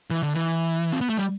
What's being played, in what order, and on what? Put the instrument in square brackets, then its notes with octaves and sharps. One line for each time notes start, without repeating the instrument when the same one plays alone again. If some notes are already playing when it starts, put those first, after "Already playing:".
[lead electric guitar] E3
D3
E3
C4
B3
A3
G3